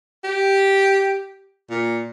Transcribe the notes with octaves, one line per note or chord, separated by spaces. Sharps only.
G4
A#2